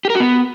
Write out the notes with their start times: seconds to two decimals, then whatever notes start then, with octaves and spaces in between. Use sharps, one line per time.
0.05 G4
0.10 A#4
0.15 F#4
0.20 B3